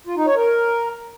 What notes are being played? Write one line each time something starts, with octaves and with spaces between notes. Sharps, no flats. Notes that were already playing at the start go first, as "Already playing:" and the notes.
F4
D#4
C#5
A#4